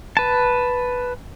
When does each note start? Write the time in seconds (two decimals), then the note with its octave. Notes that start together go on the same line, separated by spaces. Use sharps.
0.17 B4 A5